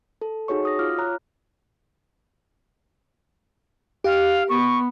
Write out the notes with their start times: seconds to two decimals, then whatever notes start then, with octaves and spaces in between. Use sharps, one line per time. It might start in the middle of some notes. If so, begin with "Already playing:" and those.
0.21 A4
0.48 D#4 F#4 G#4 C#5 C#6
0.63 F#4 D#6 A#6
0.79 F4 D6 F6
0.98 C#5 A#5 F#6
4.04 G4 F5
4.49 B3 C#6